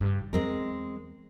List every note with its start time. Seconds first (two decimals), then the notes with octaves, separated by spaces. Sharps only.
0.01 G2 C#3
0.19 G#1
0.33 E2 G#3 C4 A#4